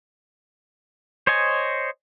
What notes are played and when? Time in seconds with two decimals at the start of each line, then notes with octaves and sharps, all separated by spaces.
1.27 C5 C#5 D#5 G#5